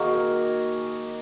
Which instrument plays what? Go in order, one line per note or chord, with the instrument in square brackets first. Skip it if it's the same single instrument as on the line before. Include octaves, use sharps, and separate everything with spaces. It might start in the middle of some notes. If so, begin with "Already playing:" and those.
Already playing: [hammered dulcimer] D#3 A#3 D#4 F#4 G#4 A#4